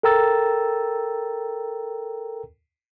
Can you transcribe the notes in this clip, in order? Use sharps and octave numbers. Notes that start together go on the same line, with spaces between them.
A4 A#4 G5 A#5 E6 A6